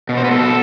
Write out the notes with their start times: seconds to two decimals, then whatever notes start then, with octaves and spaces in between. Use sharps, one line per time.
0.09 B2
0.17 C5
0.25 B4
0.31 B2 A4